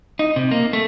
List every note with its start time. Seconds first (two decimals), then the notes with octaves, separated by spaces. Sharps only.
0.19 D#4
0.36 C3
0.51 A#3
0.73 A3